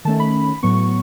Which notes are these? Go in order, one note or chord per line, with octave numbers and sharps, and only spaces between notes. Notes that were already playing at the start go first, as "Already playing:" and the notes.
D#3 A3 C#4 A5
B5
A2 F#3 B3 C#6